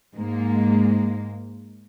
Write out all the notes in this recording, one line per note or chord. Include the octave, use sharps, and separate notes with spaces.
G#2 G#3 A#3